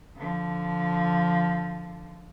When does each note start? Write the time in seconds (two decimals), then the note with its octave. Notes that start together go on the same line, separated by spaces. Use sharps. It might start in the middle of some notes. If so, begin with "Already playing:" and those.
0.17 D3 F3